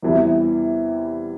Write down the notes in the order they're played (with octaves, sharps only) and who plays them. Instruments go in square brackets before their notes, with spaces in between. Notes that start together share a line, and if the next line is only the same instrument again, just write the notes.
[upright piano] E2 C3 E3 G3 E4